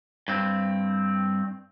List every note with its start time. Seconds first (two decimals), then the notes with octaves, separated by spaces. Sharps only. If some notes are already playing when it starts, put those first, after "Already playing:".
0.28 G2 C4